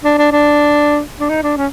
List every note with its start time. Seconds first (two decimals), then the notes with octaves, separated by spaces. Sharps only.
0.05 D4
0.18 D4
0.32 D4
1.20 D4
1.29 D#4
1.43 D4
1.57 C#4